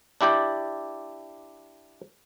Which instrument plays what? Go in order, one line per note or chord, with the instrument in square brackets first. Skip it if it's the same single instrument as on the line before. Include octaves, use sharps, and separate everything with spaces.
[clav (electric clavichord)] D4 E4 G4 D5 G5